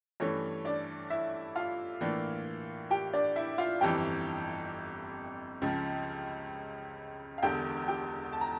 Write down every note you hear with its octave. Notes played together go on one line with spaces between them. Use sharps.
G2 E3 A3 C#4 C#5
D4 D5
E4 E5
F4 F5
A2 E3 A#3 D4
G4 G5
D4 D5
E4 E5
F4 F5
G1 F2 E3 G4 G5
C#2 C#3 F3
F5
E1 E2 D3 G4 G5
G4 G5
A5
A#5